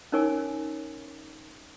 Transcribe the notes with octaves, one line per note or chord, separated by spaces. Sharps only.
C#4 D#4 A#4 C#5 G#5 D6